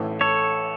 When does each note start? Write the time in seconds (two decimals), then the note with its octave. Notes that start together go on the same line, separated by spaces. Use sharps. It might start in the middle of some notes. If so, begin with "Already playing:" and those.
Already playing: A1 A2 E3 A3
0.21 A4 C#5